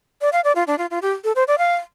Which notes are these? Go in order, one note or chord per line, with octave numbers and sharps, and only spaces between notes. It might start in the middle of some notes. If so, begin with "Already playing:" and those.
D5
F5
D5
F4
D4
F4
F4
G4
A4
C5
D5
F5